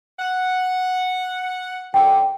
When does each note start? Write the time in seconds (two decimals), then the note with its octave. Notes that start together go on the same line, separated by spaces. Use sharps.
0.20 F#5
1.94 F#2 D3 G5